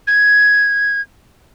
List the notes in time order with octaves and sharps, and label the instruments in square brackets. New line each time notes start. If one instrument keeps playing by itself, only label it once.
[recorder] G#6